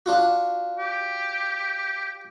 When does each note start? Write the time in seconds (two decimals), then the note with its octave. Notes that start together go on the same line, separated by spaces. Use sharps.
0.06 D4 F4 F#4
0.78 G4